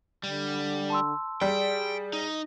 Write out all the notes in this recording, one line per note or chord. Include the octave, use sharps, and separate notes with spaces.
D3 G3
A5 C6 E6
G3 G#4 G5
D#4